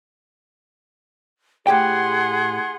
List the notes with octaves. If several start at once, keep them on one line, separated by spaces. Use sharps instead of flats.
A2 G4 G#4 F#5 G5 C6